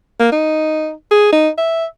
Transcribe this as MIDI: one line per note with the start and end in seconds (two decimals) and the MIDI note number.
0.20 0.30 58
0.32 0.91 63
1.11 1.31 68
1.32 1.49 63
1.58 1.85 76